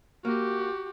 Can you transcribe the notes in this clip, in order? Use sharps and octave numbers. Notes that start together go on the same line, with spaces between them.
A#3 F#4 G4